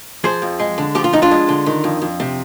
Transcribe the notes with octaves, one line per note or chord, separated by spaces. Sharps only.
F3 G#4 C5
F2
G#3
D3
F3 G4
F4
F2 D#4
D4 F4
G#3
D3
D#3
F2
F2
C3